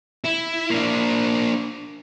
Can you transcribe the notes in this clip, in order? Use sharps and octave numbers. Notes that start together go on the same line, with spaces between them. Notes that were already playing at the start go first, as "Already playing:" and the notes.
E4
A#3 D4